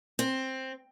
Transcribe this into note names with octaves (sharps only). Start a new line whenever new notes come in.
C4